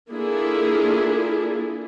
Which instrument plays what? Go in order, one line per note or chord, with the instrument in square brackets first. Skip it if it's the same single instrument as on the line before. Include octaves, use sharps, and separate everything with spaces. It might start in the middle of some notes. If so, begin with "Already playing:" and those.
[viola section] A#3 D4 E4 F4 G#4 A4